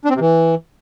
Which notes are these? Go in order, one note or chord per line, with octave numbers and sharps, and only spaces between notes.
D4
C4
C3
E3